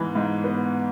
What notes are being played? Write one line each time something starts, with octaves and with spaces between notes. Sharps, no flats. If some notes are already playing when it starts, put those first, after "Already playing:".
Already playing: G#2 E3 B3
G#2
B3